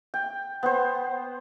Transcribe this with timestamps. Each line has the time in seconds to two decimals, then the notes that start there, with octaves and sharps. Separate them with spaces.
0.14 G5
0.63 B3 C5